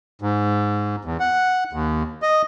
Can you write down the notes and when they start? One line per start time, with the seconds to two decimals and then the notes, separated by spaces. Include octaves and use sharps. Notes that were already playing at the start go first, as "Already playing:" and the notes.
0.22 G#2
1.05 E2
1.20 F#5
1.73 D#2
2.22 D#5